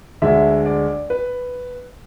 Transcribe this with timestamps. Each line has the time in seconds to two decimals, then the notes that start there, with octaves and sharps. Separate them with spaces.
0.22 D2 D3 G#3 E5
0.66 D5
1.10 B4